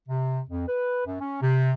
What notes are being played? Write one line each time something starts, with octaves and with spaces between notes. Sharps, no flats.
C3
F2
B4
F#2
C#4
C3